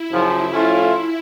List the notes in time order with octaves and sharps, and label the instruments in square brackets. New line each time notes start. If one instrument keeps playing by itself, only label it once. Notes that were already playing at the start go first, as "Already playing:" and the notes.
Already playing: [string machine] E4
[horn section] F#2 C#3 F3
A2 F3 A3 C#4 F4